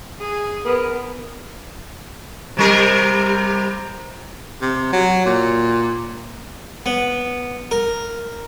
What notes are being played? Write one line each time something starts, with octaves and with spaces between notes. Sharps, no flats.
G#4
B3 A#4
C3 G3 A#4
C3
F#3
A#2
B3
A#4